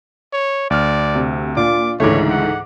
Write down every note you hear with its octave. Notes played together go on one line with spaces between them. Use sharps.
C#5
D2 D5 F6
C3
A#2 D4 F4 D5 D6
C#2 G#2 D3 E3 A3 C#5 D6
F#5